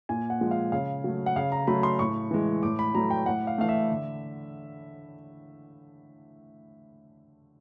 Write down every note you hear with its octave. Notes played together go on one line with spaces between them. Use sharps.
A#2 G#5
F#5
F3 G#3
F5
C#3 F5
F#3 A3
F#5
C#3 F5
A#5
F#3 A3 B5
C6
A2 C#6
E3 G#3
A2 D6
B5
F#3 A3 A#5
G5
A2 F#5
F5
E3 A3 F5
E5
D3